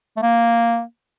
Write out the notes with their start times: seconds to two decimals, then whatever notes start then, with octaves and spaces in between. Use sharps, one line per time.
0.17 A3
0.22 A#3